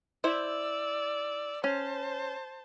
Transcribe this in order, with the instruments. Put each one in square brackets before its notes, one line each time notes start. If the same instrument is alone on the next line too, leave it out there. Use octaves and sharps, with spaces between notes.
[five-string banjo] E4 C5 E5 [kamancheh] D5 E6
[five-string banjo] C#4 [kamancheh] C5 A5